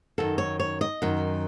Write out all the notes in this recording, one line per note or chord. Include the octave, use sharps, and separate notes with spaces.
F#2 D#3 A4
C#5
C#5
D#5
F#2 D#3